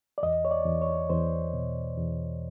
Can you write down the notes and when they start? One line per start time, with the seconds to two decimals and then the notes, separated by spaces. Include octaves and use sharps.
0.18 D5
0.23 E2 D#5
0.45 C#5
0.51 D5
0.66 E2
0.82 C#5
1.10 E2 C5
1.53 B2
1.98 E2